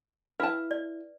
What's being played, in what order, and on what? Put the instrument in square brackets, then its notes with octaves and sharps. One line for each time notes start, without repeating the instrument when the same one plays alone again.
[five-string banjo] E4 A5 [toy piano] B4 F5
[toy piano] D5